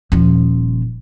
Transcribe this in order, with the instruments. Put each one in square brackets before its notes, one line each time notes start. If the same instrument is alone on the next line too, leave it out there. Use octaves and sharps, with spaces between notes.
[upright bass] D#1 F3